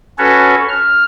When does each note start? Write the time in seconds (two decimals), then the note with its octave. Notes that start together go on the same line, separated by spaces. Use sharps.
0.18 C#4 F#4 A4 B4 C#5
0.69 F6